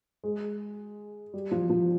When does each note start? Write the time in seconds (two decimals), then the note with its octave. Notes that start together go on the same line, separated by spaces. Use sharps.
0.24 G#3
1.34 G3
1.51 F3
1.70 F3